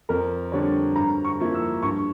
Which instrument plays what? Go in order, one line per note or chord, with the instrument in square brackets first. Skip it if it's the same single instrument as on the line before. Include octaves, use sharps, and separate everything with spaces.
[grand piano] F2 [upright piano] A#4
[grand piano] D3 G3 D4 [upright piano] C#5
[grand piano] G2 [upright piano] A#5
[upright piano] C#6
[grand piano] F3 A#3 E4
[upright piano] E6
[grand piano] G2 [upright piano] C#6